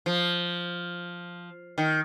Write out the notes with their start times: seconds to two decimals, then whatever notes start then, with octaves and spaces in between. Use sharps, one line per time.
0.06 F3
1.78 D#3